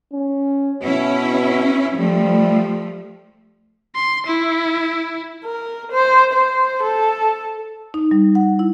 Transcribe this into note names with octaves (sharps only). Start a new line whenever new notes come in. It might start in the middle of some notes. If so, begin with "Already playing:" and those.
C#4
B2 C#4 E4
F3 G3 A3
C6
E4
A#4
C5
C5
A4
D#4
G3
F#5
E4